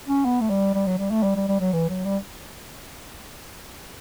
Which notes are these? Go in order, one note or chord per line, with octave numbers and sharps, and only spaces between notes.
C#4
B3
A3
G3
G3
F#3
G3
A3
G3
G3
G3
F#3
E3
F#3
G3